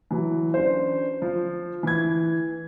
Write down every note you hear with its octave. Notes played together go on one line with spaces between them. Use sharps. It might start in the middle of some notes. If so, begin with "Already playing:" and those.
E3 F#3
C#4 D4 C5
F3
E3 G#6